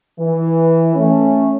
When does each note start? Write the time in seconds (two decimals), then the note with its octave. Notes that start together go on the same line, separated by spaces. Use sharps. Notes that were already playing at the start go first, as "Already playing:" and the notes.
0.19 E3
0.95 A3 C#4